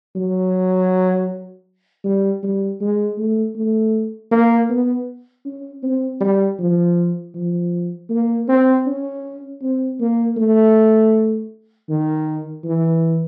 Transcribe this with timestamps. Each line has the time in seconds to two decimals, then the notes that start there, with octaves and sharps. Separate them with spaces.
0.15 F#3
2.04 G3
2.43 G3
2.80 G#3
3.18 A3
3.56 A3
4.31 A#3
4.69 B3
5.45 C#4
5.83 C4
6.21 G3
6.59 F3
7.35 F3
8.10 A#3
8.48 C4
8.86 C#4
9.62 C4
10.00 A#3
10.37 A3
11.89 D#3
12.64 E3